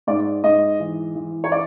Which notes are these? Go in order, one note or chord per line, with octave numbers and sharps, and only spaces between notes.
G#2 D5
G#2 D#5
E3
E3
C#5
D5